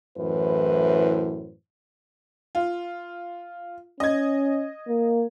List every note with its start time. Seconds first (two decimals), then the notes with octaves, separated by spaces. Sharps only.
0.17 F#2 A2 E3 E4 B4 C5
2.55 F4
4.00 C#4 D#5 G#6
4.88 A#3